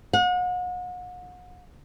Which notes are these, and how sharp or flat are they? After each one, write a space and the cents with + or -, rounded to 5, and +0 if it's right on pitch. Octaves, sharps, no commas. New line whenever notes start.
F#5 -40